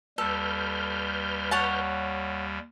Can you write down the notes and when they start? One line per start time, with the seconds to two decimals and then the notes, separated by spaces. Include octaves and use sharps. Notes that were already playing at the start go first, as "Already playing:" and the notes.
0.18 D#2 G3 A4 B4 F6 G6
1.51 C#5 F#5 A5